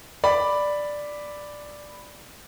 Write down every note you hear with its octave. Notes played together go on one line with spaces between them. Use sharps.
D5 B5